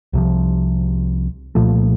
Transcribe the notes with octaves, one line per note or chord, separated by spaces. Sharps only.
C2 C3 F3
C2 A#2 F3 A3